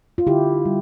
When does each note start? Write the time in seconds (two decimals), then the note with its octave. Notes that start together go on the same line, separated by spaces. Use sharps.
0.18 F4
0.27 D3 E4 G4
0.65 G3